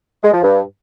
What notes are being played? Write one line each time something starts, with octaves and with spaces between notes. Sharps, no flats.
G#3
F3
G2